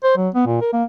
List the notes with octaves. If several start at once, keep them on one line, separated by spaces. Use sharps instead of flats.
C5
F#3
B3
A#2
A#4
A#3